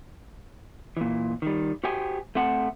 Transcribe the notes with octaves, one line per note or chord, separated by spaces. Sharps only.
A#2 E3
D#3 G3
F#4 G4 C5 G5 G#5
A3 C4 F#5 A5